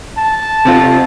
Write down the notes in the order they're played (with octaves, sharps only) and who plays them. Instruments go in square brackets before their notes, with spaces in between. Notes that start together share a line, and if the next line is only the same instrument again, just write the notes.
[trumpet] A5
[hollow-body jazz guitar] C3 C4 F4